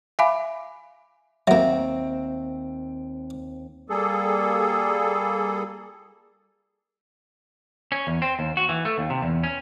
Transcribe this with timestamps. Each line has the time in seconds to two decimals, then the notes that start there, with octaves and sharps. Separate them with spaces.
0.19 E5 F5 G#5 B5 D6
1.47 D#2 F#3 A#3 C4 E5
3.90 G3 A#3 G#4 A4
7.92 C#4
8.07 E2
8.22 C4
8.39 D#2
8.57 F#4
8.69 E3
8.85 A3
8.98 D#2
9.10 C3
9.22 E2
9.43 C#4